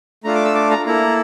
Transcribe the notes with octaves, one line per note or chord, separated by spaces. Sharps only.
A3 D4 F4 A4 A#5
D6
E6
D6
A#5
A#3 E4 A4 A#5